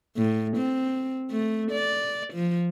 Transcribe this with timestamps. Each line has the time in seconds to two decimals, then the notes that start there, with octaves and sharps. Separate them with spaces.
0.17 A2
0.57 C4
1.31 A3
1.71 D5
2.34 F3